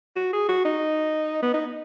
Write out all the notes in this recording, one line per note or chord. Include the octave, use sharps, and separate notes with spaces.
F#4
G#4
F#4
D#4
B3
D#4